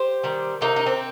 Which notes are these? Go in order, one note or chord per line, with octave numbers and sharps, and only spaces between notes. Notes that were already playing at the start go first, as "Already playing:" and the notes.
Already playing: G4 C5
D#3 G3
C3 A#3 D#4
D#4
C4